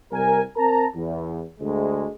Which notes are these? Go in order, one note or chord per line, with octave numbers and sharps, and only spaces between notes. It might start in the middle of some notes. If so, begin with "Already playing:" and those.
C2 A#4 G#5
C4 A#4 A5 A#5
E2
D2 G#3